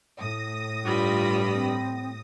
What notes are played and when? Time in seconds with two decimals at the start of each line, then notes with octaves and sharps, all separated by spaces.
0.19 A2 D#6 A#6
0.85 G2 G3 F4 B5
1.53 C4